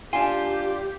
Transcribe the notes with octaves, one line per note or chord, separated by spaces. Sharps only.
D4 F4 G4 G#5